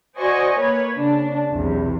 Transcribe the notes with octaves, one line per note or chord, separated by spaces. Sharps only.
F#4 C5 D5 D#5 G#5 C#6
A#3 B4 C#5
C#3 D4
B1 E2 C3